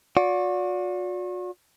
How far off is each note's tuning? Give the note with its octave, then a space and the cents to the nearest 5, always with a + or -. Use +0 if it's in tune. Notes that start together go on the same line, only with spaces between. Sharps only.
F#4 -40 D5 -25